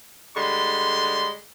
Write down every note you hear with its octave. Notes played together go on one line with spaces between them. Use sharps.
D3 G3 G#3 C6